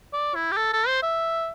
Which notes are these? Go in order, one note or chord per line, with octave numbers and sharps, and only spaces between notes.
D5
E4
G4
A4
A4
C5
E5